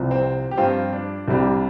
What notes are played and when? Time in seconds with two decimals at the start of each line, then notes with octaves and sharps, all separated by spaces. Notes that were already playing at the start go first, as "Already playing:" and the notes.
Already playing: C2 C3 F3
0.11 C4
0.51 G4
0.57 G2 F3 C4 F4
0.93 D4
1.28 C2 C3 G3 D4